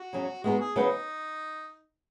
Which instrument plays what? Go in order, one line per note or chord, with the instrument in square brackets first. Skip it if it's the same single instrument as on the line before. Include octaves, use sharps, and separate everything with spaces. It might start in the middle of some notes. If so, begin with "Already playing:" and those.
Already playing: [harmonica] F#4
[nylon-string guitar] C#3 F#3 C#4
[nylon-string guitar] G#3 B3 D#4 G#4 [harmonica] F#4
[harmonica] G#4
[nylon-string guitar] C#3 F#3 C#4 F#4 B4 [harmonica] D#4